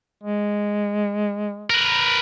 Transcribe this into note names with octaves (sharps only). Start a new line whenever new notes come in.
G#3
A#4 B4